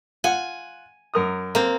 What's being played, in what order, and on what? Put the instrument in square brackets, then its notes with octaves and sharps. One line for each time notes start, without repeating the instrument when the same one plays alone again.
[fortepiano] F4 F#5 [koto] G#5
[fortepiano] F#2 A#4 D#6
[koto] A#3 C4